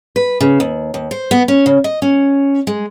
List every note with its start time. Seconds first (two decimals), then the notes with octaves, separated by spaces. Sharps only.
0.16 B4
0.40 C#3
0.60 D#2
0.94 D#2
1.11 C5
1.31 B3
1.48 C#4
1.66 C#3
1.84 D#5
2.02 C#4
2.67 G#3